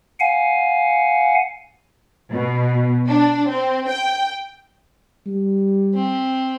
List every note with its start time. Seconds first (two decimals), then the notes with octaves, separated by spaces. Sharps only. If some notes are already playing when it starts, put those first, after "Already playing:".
0.20 F5 F#5 G#5
2.31 B2
3.08 D4
3.48 C4
3.89 G5
5.26 G3
5.95 C4